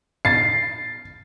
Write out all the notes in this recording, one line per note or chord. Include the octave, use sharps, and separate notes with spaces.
A6 C7